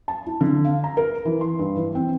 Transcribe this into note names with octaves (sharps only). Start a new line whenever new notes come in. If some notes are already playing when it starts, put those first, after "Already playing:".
A5
E4
D3
F5
A#5
A#4
E3
C6
G2
E3
C4